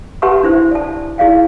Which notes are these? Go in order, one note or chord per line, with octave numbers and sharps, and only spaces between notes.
G4 B4 F#5 A5 C6 C#6
D4 E4 C5
D5 A5
E4 G#4 D5 F5 G5